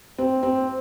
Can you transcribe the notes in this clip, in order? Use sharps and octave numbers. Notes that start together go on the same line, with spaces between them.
C4
C4